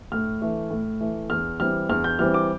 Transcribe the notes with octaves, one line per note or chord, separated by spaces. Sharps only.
A2 F6
E3 A3
A2
E3 A3
E2 F6
E3 G3 C4 F6
E2 F6
G6
E3 G3 C4 F6
D6